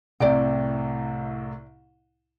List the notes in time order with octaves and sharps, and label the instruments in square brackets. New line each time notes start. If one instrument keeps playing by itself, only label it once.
[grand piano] C2 A2 C3 [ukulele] D5 G5